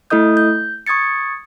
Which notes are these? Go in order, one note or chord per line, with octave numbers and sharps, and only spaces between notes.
A3 E4 A4 D#5 D#6 G6
G6
C#6 D#6 G#6 A6 C#7